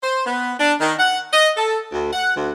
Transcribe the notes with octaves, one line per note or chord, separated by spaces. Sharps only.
C5
B3
D4
D#3
F#5
D#5
A4
D2
F#5
D2